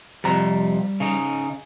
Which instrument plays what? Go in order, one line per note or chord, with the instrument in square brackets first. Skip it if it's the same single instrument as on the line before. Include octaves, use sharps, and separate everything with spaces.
[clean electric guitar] F2 C3 [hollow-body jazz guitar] G3 A#5
[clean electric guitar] C#3 D#4